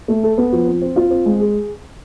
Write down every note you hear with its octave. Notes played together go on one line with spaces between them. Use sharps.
A3
A4
B3
F3
C4
C4
F4
C4
G#3
G#4